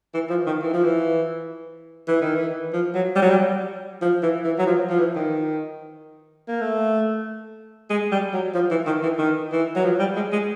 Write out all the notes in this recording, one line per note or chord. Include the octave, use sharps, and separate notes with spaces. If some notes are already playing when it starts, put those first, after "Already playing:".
E3
F3
D#3
E3
F3
E3
E3
D#3
E3
F3
F#3
G3
F#3
G3
F3
E3
E3
F#3
F3
F3
E3
D#3
A#3
A3
G#3
G3
F#3
F3
E3
D#3
E3
D#3
E3
F#3
F3
G3
G#3
G#3